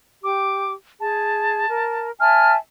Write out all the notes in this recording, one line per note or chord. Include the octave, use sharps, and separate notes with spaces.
G4 D6
G#4 A5
A#4
E5 G#5 A5 F6